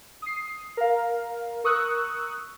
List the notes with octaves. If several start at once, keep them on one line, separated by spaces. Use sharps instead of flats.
D#6 C7
A#4 F5
A#4 C#6 D#6 E6 F#6